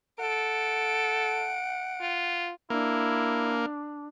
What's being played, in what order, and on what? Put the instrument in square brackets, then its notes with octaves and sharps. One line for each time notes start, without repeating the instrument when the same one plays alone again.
[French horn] A4 [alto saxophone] F#5 [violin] D7
[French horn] F4
[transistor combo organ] A#3 [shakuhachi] D4 [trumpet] E4